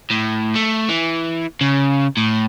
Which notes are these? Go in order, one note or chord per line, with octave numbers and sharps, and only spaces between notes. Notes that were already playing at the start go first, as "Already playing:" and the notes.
A2
A3
E3
C#3
A2